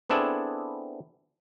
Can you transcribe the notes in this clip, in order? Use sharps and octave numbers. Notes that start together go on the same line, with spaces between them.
B3 C4 D4 E4 G#4 A4